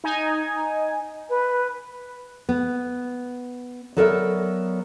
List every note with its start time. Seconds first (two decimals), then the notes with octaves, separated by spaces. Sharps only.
0.04 D#4 G#5
1.29 B4
2.49 B3
3.97 F#3 B3 A4 A#4 D5 E5